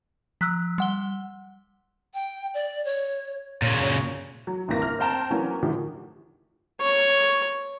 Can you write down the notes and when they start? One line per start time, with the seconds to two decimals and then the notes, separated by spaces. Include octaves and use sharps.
0.41 F3 E6 F#6 B6
0.78 G3 F#5 G7
2.14 G5
2.54 D5
2.85 C#5
3.62 A#2 C#3 C#5
4.47 F#3
4.68 G1 D#2 A2 C3 A#3 A#6
4.82 F6
4.99 C4 C5 G5 A5 A#5
5.30 E3 F#3 A#3 B3 C#4 F#4
5.63 A2 D3 D#3 F3 F#4 G4
6.81 C#5